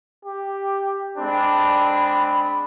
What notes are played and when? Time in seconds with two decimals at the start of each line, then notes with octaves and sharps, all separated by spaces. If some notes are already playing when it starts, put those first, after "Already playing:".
0.25 G4
1.18 G#3 C4 D4 B5